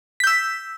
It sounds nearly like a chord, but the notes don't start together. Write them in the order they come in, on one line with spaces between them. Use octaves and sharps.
B6 G6 E6